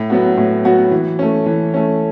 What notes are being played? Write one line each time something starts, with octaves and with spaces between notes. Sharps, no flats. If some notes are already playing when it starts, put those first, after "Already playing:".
Already playing: A2
F#3 B3 F#4
A2
F#3 B3 F#4
E3
A3 C#4
E3
A3 C#4